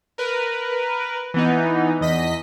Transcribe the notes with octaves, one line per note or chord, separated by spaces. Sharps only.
A#4 B4
E3 B3 D#4
E2 D#5 B6